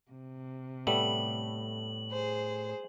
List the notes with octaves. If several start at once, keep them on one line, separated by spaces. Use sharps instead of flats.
C3
A2 G3 A3 B3 F#7
G#4 C5